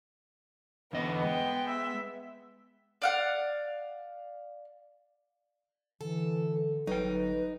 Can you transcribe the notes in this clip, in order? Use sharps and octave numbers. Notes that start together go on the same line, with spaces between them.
E2 D3 B3 D#5
G#3 G5
E5
D5 F5 F#5
D3 E3 A4
G1 F#3 D#4 B4 G5